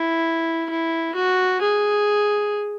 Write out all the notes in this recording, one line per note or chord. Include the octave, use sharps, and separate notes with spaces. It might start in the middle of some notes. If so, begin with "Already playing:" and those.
Already playing: E4
E4
F#4
G#4